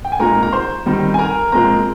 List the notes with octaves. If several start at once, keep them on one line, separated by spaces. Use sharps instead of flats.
G5
G#5
A#2 G#3 C4 D#4 A#4 A#5
A#5
C5 C6
D#3 G3 C4 D#4
G#5
A#4 A#5
A#2 F3 G#3 C4 A#4 A#5